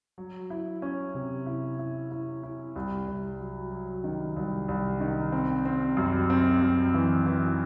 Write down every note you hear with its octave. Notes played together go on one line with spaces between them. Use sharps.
F#3
E4
C#4
C3
E4
E4
E4
E4
C2
C2
F#3
F#3
D#3
C2
C2
D#3
C4
C4
F#2
C4
F#2
E3
E3